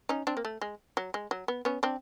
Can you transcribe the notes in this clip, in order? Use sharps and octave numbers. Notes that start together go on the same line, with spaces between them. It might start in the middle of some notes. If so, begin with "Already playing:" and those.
C#4 D#4
C4 D4
A#3
A3
G#3
F#3
G#3
F#3
B3
B3 C#4
C4 D4